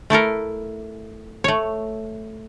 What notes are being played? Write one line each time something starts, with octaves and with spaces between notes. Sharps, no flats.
A3 E4 A4 A#4
A3 C#5